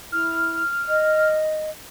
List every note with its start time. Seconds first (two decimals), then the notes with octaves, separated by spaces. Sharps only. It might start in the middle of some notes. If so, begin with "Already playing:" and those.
0.12 E4 F6
0.89 D#5